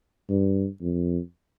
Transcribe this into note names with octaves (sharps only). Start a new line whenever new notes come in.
G2
F2